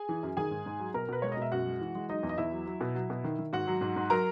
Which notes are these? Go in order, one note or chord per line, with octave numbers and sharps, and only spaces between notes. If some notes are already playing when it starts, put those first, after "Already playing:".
Already playing: G#4 G#5
E3
F#2
D#3 G#4 G#5
G#2
G#2
F#3
B2 A#4 A#5
B2 B4
G#3 C#5
D#5
B2 E5
F#2 F#4 F#5
G#3
E3
G#3
F#3 D#4 D#5
E2
D#5
E2 E4 E5
F#3
F#3
B2
F#3
B2
D#3
D#3
G#2 F#4 F#5
F#3
G#2
G#2
F#3 A#4 A#5